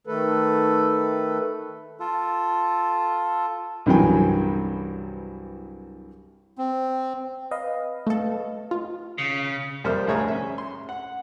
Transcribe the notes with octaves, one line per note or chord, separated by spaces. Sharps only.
D#3 A3 A4 B4
F4 A4
C2 G2 E3 F#3 G5 G#5
C4
B4 D#5 F5
A3 A4
F4
C#3
F2 G3 A#3 C5 E5 F6
D2 A2 G#4 C#5 A#5
C#4 E5
C6
F#5